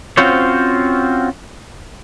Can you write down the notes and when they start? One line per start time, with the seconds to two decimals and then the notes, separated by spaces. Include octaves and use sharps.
0.17 C4 C#4 F4 F#4 C5 C#5